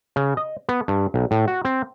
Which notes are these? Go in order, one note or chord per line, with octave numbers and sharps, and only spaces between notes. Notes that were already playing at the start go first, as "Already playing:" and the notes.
C#3
D#5
B3
G2
B1
A2
F#4
C4